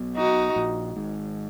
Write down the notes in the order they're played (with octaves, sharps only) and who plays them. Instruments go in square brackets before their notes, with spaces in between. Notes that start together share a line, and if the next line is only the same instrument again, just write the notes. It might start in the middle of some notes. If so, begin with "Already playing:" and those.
Already playing: [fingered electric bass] B1 B2
[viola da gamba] D#4 F#4
[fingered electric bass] A#1 A#2
G#1 G#2